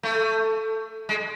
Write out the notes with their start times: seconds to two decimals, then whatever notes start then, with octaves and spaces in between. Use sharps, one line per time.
0.03 A3
1.09 G#3